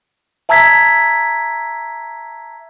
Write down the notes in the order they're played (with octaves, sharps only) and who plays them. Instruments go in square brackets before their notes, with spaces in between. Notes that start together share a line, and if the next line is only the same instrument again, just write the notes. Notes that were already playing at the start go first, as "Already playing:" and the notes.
[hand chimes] E5 A5 A#5 E6 G#6 B6